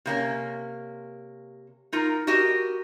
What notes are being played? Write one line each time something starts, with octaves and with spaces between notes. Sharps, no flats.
C3 A#3 C#4
D#4 F4 A#4
F#4 G4 A#4 D#5